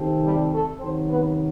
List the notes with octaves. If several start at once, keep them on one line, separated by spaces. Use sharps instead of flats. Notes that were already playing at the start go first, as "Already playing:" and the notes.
Already playing: C3 D#3 A3 C4
G3 G4
A3 A4
C3 D#3 F#3 C4 C5
B3 B4